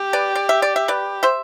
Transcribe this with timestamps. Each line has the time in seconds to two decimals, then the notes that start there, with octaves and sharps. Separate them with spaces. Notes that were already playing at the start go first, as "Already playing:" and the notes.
Already playing: G4
0.13 B4 D5
0.35 D5
0.49 E5
0.62 D5
0.76 E5
0.88 B4 D5
1.23 C5 E5